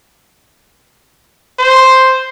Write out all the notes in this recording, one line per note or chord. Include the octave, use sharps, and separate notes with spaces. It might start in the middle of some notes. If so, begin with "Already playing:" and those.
C5